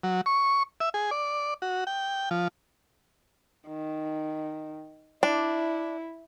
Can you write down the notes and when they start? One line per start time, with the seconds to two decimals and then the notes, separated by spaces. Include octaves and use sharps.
0.04 F#3
0.26 C#6
0.80 E5
0.94 G#4
1.11 D5
1.62 F#4
1.87 G5
2.31 F3
3.68 D#3
5.23 D4 E4